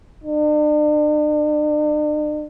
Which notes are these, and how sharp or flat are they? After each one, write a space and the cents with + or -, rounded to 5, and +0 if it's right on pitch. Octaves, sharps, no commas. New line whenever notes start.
D4 +40